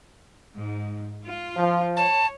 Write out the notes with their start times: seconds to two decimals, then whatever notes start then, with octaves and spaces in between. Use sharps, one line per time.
0.56 G#2
1.24 F4
1.57 F3
1.96 C#5 A5